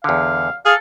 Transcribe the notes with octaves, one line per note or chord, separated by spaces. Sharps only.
E2 D3 F5
G#4 A4 F5